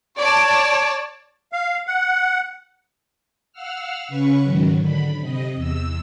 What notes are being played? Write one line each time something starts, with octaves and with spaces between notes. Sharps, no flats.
C#5 D5 A5
F5
F#5
F5 F#5 E6 F6
C#3 C#4 B4 C#6
G#2 D#3 F#3
D3 B5
C3 D#5
E2 E6